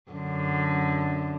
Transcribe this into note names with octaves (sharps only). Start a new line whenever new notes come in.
F#2 D3